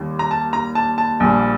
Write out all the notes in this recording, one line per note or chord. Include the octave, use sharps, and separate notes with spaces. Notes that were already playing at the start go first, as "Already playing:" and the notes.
Already playing: D#2 D#3 G3
A#5
A5
A#5
A5
A5
A#1 A#2 G3